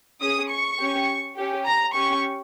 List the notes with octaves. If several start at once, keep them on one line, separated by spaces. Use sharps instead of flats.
C#4 G#4 D#6
C#6
C#4 G4
C#4 G4
A#5
C#4 G4 C#6